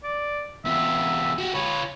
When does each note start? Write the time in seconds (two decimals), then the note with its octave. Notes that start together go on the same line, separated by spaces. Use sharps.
0.04 D5
0.65 E2 F4 E5
1.38 F#4 G4
1.54 F4 B4 C#5